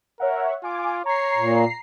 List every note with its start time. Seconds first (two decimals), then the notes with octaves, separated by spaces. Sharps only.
0.20 A#4 C#5 E5 F#5
0.63 F4 G#5 D6
1.06 C#5 A#5 C7
1.36 A#2